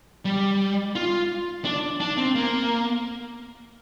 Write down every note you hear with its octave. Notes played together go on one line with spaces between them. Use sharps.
G3
F4
D4
D4
C4
A#3